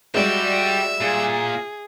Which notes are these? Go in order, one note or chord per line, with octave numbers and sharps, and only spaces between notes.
G3 G#3 F#4 G4 D5 E5
A#2 G#4